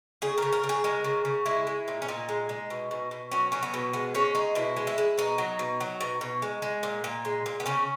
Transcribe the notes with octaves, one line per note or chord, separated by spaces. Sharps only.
C#3 G#4
C#3 A#4
A#4
C#3
G#4
G#3 A#4
C#3
C#3
G#3 E4
G#3
A#2
C#4
A#2 D#4
G#3
G#3
B2
B2
B2
F#3 C#4
F#3 C#4
B3
B2
G#3 B3
G#3 C#4
G#3 D#4
B2 E4
G#3
E4
G#3
B2 D#4
F#3
B2
F#3
B2
B2
G#3
G#3
A#2
A#2
G#3
A#2
B3
C#3 C#4